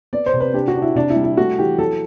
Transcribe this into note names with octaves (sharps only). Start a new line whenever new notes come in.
B3 D5
C5
C3
B4
D4 G4
F#4
D4
E4
C3 D4
E4
G3
E4
A3 F#4
E3 G4
F#3 A4